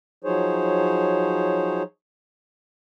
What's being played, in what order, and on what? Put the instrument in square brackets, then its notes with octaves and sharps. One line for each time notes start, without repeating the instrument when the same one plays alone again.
[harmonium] F3 F#3 D#4 G#4 C5 C#5